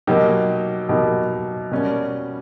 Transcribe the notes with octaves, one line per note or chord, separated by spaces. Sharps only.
B2 F#3 A#3 D#4 G4
B2 F#3 A#3 D#4 G4
B2 G3 A#3 C#4